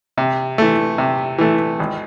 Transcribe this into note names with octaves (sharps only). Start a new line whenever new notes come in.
C3
E3 A3
C3
E3 A3
G#1